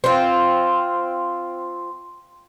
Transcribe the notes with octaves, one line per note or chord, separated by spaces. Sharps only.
C4 F4